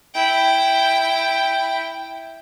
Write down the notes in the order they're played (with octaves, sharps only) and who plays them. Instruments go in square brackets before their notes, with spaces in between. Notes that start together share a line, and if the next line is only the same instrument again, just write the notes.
[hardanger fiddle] E4 G5